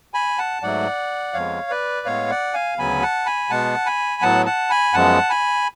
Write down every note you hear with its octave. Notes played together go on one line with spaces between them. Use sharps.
G#5 B5
F#5 A5
G#2 F#3 A3 D5 F#5
F2 F3 G#3 B3 C#5 F5
B4 D5
A2 G#3 B3 C#5 F5
D5 F#5
F5 G#5
D2 C#3 F#3 B3 G#5 B5
F#5 A5
G#5 B5
B2 G#3 B3 F#5 A5
G#5 B5
A2 F#3 B3 F#5 A5
F#5 A5
G#5 B5
F#2 F3 G#3 B3 F#5 A5
G#5 B5